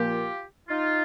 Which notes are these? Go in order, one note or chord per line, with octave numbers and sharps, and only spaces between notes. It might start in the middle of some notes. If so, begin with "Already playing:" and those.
Already playing: A#2 F3 A#3 F4 G4
D#4 F4